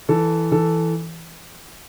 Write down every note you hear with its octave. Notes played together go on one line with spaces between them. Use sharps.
E3 A4
E3 A4